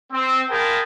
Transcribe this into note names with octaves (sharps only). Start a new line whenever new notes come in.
C4
F4 G#4 A#4 G5 A5 B5